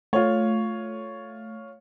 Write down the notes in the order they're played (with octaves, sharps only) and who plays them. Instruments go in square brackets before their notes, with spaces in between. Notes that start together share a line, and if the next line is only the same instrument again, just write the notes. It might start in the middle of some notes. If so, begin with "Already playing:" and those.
[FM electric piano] A3 [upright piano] F4 C#5